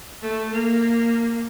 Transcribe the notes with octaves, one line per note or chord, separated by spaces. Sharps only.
A3
A#3